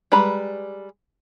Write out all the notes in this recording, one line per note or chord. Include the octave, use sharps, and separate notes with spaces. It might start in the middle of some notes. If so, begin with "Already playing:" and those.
G3 G#3 B4 A#5 B5